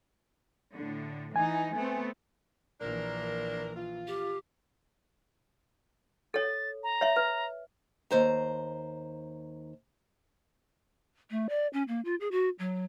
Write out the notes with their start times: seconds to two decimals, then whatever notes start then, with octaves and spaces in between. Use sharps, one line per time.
0.74 A2 D3
1.36 E3 D#4 G#5
1.74 A3 B3 C4
2.81 A#1 E3 A#3 D4 A#4
3.76 F4
4.07 G4
6.34 A4 C#5 A6
6.83 A#5
7.01 C#5 E5
7.16 B4
8.11 D#2 C5 A#5
11.31 A3
11.49 D5
11.73 C#4
11.88 A#3
12.05 F4
12.20 G#4
12.31 F#4
12.59 F#3